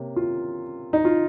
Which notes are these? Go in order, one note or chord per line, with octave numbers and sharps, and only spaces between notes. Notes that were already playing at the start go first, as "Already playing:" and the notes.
Already playing: C3 A#3 C#4
F4
D#4
F4